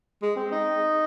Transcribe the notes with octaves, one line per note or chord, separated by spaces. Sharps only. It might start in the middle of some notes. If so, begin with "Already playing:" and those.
G#3
C4
D#4